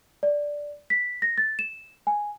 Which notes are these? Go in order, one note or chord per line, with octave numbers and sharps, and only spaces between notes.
D5
B6
A#6
A6
E7
G#5